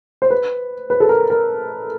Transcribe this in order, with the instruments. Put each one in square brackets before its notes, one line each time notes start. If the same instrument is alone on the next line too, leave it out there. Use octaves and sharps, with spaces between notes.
[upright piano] C5
B4
B4
A4
A#4
A#4